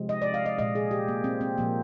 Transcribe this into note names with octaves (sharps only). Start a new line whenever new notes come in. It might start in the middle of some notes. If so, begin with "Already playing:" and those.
Already playing: C3 F3 G#3
D#5
D5
F5
D#5
A#2 G#3 D#5
G#4
G4
A#3
C4
C4
A#2 F3 A#3